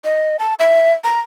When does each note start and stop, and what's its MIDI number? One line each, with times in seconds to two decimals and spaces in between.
0.04 0.36 75
0.39 0.54 81
0.59 0.92 76
1.04 1.20 82